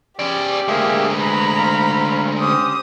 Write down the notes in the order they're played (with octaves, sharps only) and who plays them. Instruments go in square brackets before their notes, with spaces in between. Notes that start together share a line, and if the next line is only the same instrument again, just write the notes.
[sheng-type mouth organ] C#4 [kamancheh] G4 [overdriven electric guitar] G#4 D5
[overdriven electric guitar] D2 G#3 [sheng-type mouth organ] A#3 G#4 E5
[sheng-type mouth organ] G#4 B4 [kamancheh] A#5 B5
[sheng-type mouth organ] C4 F5
[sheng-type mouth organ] C#4 G4 C5 [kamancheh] D#6